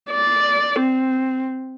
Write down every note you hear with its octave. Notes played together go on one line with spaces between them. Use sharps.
D5
C4